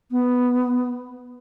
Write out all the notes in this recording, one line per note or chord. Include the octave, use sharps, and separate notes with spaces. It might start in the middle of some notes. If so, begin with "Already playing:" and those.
B3